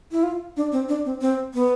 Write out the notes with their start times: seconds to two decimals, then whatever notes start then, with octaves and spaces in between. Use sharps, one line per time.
0.12 E4
0.23 F4
0.57 D4
0.72 C4
0.89 D4
1.05 C4
1.21 C4
1.54 B3